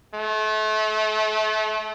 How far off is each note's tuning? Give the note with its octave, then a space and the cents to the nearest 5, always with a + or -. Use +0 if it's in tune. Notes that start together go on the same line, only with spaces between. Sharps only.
A3 -35